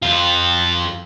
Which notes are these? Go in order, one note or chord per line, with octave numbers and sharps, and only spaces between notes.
F2 F4